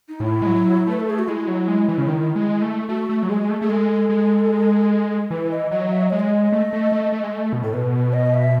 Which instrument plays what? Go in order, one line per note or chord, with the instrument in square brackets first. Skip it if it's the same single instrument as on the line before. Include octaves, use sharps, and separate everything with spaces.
[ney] D#4
[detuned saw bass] A2 [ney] E4
[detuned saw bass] G#3
F#3
[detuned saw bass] A3 [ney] B4
[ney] A4
G#4
F#4
[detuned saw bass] G#3 [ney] E4
[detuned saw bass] F#3
G#3
E3
C#3
D#3
G#3
A3
[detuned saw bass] A3 [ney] F#4
[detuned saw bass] A3
F#3
[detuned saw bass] G#3 [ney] G#4
[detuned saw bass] A3
[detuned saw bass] A3 [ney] G#4
[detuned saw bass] G#3 [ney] A4
[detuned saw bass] G#3
[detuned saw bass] E3 [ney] B4
[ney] D#5
[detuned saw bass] F#3 [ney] D#5
[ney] E5
D#5
[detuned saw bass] G#3 [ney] C#5
[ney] D#5
[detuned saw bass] A3
A3
A3
A3
G#3
A3
B2
[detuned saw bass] A2 [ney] A4
[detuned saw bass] B2 [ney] B4
[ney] B4
D#5
E5